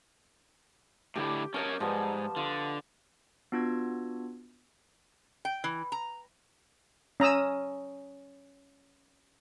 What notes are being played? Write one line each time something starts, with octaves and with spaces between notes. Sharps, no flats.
A2 D3 E4 G4 D6
A#3 C#4 A#4 C#5 D#5 A5
G#2 F3 G3 B3
D3 F4
B3 D4 F4 F#4 E6 G#6
G5
E3
A#5
C#4 A#5 D#6 E6